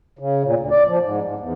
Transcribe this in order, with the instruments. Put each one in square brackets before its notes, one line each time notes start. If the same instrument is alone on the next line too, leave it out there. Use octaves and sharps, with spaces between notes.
[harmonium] C#3
A#2
D2
D5
F3
G#2
G#2
E2